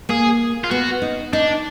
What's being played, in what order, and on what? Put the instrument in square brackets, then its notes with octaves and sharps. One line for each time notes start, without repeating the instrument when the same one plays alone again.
[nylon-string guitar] A#3 [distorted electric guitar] G#4
[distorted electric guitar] F4
[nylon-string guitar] B3 [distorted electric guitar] F#4
[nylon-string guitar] D#4
[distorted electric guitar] D4 [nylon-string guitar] D#4